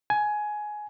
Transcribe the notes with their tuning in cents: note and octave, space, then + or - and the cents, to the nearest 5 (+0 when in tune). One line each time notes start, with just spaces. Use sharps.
G#5 +15